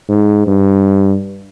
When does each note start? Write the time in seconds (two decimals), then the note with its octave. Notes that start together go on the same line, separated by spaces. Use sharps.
0.09 G#2
0.47 G2